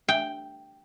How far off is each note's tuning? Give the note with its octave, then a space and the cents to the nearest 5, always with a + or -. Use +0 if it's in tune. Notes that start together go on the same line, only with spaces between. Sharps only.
G5 +0